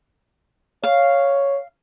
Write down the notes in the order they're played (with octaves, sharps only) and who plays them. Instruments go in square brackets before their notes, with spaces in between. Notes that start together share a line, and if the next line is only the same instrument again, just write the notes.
[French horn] C#5 [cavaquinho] F5